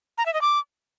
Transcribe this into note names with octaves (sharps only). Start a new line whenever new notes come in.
A#5
E5
D#5
D6